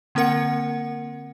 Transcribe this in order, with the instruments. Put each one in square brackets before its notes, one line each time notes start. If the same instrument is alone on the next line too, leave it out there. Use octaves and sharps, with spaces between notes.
[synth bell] D3 A#3 C4 A#4 F#5 C#7